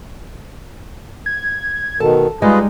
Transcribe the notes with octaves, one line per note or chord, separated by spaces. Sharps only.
G#6
B2 D#3 A4 A5
G3 G#3 D#4 F4 G#4 B4 D#5